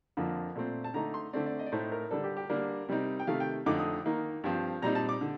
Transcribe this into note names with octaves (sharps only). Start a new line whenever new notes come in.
F2 D3 F3 A#3
A#2 A3 C4
A5
D3 A3 D#4 A#5
C6
D3 A3 C4 D5
D5
D#5
D5
A2 A3 D#4 C5
A#4
D3 G3 D4 A4
G4
G4
D3 G3 A#3 D4 A#4
C3 G3 C4 D#4
G5
C3 D#3 A3 F5
G5
F2 D3 A3 D#4 D6
D#6
D#3 A#3 D#4
G2 F3 C4
A#2 G3 C4 D#4 A#5
A5
D6
D3